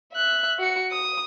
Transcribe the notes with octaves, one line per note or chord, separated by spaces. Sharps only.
E5 F#6
F#4 C#7
D#6